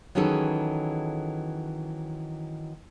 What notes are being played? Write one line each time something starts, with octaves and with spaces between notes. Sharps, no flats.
D#3 E3 F#3 C#4 G#4 A4